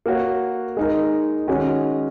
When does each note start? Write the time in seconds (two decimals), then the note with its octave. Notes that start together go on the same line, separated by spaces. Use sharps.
0.06 A#3 F#4 C#5
0.77 G#3 D#4 A#4
1.48 D#3 G#3 C#4 F#4